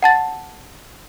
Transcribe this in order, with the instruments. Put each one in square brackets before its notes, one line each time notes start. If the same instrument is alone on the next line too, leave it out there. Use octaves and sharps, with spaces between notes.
[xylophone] F#5 A5 A6